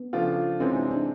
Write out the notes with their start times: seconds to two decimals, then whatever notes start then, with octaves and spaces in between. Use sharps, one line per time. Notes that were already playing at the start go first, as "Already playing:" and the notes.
Already playing: B3
0.13 C#3 F3 A3 D4 F4
0.60 C3 E3 G#3 C4 C#4 D#4
0.75 D4
0.91 D4